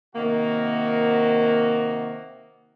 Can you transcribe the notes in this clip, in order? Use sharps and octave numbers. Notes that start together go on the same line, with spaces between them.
C3 D#3 A#3 F#4